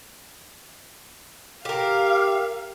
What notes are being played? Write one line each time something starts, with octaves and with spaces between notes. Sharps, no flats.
G4 A#4 F5